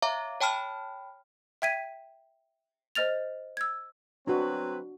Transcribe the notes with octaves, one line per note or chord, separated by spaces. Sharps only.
C#5 E5 F5 A#5 D6
C#5 G5 A5 B5 F6
E5 G5 G#6 B6 D#7
C5 D#5 F6 A6 F7
E6 G#6
F#3 C4 D4 F#4 B4